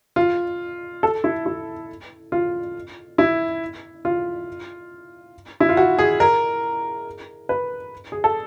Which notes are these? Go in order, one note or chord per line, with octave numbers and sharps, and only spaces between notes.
F4
A4
E4
E4
F4
E4
F4
E4
F4
F#4
G#4
A#4
B4
G#4
A4